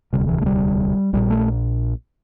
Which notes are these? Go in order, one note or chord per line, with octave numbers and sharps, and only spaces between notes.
E1 D2 C3 G3
E3
A3
G3
A#1 A#2 G3
A3